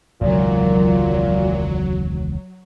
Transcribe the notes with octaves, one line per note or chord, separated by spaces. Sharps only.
E1 C#2 A#2 D#3 F#3